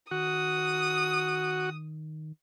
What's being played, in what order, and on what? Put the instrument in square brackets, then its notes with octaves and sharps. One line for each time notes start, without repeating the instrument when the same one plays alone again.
[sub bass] D#3 [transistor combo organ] F#4 [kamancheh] D#6